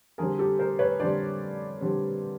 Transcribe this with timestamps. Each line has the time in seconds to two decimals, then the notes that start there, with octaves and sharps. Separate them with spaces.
0.18 D3 G3 C4 G#4 A#4
0.39 G4 A4
0.59 A#4 C5
0.79 B4 C#5
1.00 D3 G3 C4 C5 D5
1.81 D3 G3 C4